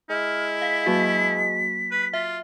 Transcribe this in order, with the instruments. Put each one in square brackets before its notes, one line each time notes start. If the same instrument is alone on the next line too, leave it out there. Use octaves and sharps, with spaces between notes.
[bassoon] G#3 [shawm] E4 [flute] F6
[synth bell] F5 [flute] B6
[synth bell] F#3 A#3 F#4
[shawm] B4
[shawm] F4 [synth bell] E5